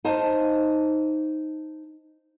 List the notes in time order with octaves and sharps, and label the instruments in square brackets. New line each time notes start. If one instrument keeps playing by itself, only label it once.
[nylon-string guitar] D#4 C5 D#5 F5 A5